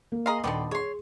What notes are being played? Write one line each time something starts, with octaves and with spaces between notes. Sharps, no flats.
A#3
G#4 D#5 F5 A#5 C6
D#1 B2 D3 B3 D5 G5 C6
G#4 C#5 C6 C#6